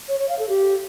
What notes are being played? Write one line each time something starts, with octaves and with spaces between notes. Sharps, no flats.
C#5
C#5
F5
A4
G4